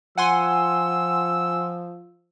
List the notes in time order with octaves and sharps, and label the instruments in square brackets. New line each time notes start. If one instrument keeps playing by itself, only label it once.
[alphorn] F3 [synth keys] F#5 G#5 C6 [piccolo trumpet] E6